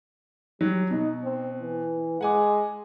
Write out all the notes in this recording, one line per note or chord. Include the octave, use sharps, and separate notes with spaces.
F#3 G3
B2 D#4
C4
E3
G#3 F#5 G#5 D6